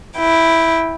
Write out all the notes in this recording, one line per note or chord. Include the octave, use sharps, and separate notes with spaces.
E4 G5